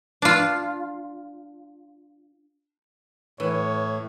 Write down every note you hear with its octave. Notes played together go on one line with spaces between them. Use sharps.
D4 F4
A2 E3 C#5